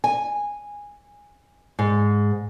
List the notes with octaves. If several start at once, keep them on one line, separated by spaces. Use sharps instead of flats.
G#5
G#2